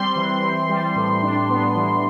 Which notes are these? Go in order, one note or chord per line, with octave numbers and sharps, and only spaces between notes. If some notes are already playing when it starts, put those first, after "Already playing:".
Already playing: G3 C4 C6
E3
C4
G3
A2
D4
B3
E3